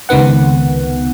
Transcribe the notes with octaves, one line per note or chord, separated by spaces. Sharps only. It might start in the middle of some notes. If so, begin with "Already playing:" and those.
C#2 C3 D#3 B3 F#5